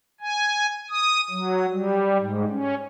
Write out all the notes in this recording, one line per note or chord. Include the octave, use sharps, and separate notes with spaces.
G#5
D#6
F#3
G3
G#2
C#4